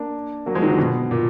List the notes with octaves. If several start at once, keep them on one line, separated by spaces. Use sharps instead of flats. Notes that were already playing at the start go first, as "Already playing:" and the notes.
Already playing: A#3 D4
F#3 A#3
F3 G#3
D#3 F#3
D3 F3
B2
A#2